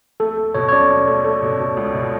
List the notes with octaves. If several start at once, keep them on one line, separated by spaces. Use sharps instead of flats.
A3 A4
A3
B2 C#5
C#5
C#4 D5
C#4
A3
A3
B2
B2
C#2
B2